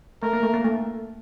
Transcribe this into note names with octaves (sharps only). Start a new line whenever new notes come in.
A3 A#4
A#3
A3
A#3
A3